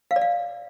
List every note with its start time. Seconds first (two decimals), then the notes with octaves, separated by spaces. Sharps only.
0.11 F5
0.16 D5
0.22 F5